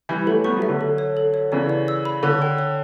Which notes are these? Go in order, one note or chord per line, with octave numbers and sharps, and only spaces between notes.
E3 G3 E5
F#3 A3 A4
G3 B3 C#6
F#3 A3
E5
D3 F#3
A4
C#5
A4
C#5
C#3 E3 D5
D5
E6
B5
D3 C#5
G5
C#5